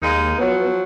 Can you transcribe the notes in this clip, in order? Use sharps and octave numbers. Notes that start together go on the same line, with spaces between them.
D#2 G#3 A#3 D#4
F3 F#3 B3